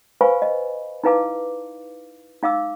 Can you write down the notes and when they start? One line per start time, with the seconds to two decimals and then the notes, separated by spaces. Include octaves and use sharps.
0.21 B4 C5 F5 G#5 B5 C#6
0.42 D#5
1.04 D#4 E4 B4 F5 A5 D6
2.43 D#4 F5 D6 E6